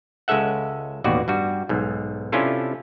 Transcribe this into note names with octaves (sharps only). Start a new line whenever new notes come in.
C#2 G#3 C#4 A4 E5 F#5
A1 D#2 B2 F#4 D5
G2 G3 F#4
B1 G#2
C3 C#4 D4 E4 F4 A4